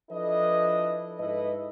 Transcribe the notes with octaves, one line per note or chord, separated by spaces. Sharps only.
F3 D4 E4 A4 B4 D#5
G#2 E4 A4 B4 D#5